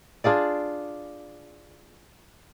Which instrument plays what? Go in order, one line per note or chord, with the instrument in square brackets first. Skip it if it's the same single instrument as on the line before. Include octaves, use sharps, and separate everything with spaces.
[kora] D4 F4 G#4 D5